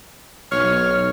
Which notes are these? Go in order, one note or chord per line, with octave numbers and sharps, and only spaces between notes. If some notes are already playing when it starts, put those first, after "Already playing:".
B1 C#5 F6